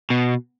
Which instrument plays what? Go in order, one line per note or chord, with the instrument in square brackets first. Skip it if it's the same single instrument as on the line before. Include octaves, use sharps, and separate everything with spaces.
[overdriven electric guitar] B2